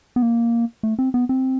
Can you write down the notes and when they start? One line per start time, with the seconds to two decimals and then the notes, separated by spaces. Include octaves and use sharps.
0.16 B3
0.22 A#3
0.83 A3
0.99 C4
1.14 B3
1.29 C4